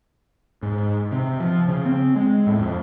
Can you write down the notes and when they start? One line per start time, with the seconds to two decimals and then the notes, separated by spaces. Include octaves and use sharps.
0.63 G#2
1.12 C3
1.40 F3
1.68 C#3
1.86 C4
2.16 G#3
2.47 A2
2.59 F2